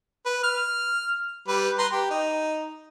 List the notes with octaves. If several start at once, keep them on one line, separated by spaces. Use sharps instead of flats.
B4
F6
G3 B4
B4 A#5 C6
G4
D#4